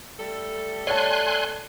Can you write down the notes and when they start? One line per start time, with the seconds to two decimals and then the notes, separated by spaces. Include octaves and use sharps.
0.20 G3 A3 A4
0.87 C#5 D5 G#5 A5 C6 F#6